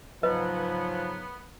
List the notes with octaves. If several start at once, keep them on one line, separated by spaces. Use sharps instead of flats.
G#2 C#3 F3 F#3 B3 B4 D#5